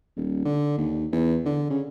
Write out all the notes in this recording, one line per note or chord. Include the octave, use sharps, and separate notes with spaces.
D#1
D3
D#2
E2
D3
C#3